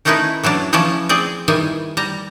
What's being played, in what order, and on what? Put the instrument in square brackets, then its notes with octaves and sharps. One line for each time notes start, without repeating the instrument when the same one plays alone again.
[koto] D#3 A3 C#4 D#4 E4 B4
E3 F#3 C#4 D4
C#3 E3 F3 C#4 D5 A5
C4 G#4 D5
D#3 E3 G3 G#5
G3 A#5